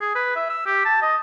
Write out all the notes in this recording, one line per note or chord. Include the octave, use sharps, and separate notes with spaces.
G#4
B4
E5
E6
G4
A5
D#5